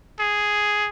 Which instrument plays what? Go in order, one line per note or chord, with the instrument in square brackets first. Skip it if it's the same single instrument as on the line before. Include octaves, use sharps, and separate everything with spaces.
[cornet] G#4